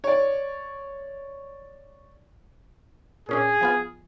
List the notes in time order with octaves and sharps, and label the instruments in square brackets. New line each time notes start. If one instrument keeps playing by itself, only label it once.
[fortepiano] C#5 D5
[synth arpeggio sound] A#2 C#4 D4 [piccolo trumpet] G#4
[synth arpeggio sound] F3 B3 F4